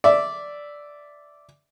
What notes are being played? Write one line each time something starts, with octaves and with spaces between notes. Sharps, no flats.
D5 E5